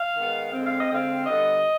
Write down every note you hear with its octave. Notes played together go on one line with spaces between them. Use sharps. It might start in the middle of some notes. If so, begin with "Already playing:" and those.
Already playing: F5
D#3 G#3 B3
D3 G#3 C4
F5
D#5
D3 G#3 C4 F5
D3 G3 B3 D#5